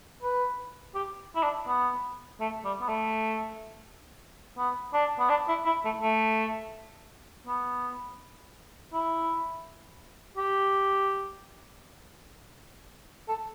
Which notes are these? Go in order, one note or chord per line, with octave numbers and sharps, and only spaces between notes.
B4
G4
E4
D4
B3
A3
G3
B3
A3
B3
D4
B3
D4
E4
E4
A3
A3
B3
E4
G4
A4